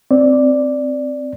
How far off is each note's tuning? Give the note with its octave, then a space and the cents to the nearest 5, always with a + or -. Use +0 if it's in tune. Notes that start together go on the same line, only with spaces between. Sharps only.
C4 +0 D5 +0